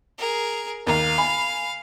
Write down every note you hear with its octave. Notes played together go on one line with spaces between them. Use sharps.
G#4 A#4
D#2 A#4 F5 A#5
G#5 B5